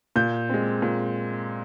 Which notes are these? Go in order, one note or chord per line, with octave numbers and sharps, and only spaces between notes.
A#2 G6
G#3 C4
A#2